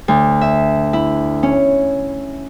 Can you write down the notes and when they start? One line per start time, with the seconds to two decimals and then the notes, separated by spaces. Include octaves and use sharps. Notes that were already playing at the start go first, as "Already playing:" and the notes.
0.08 D2
0.41 E5
0.93 E4
1.43 C#4